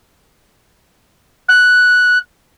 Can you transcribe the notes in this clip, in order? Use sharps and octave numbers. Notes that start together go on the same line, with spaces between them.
F#6